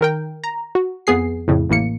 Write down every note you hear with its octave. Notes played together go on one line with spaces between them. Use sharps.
D#3 A#4 G5
A#5
F#4
F2 B3 G#4 C7
F2 A2 C#3
A1 A2 A#3 C#7